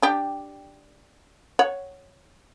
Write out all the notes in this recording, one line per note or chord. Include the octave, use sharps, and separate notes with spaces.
D4 G4
C#5 F#5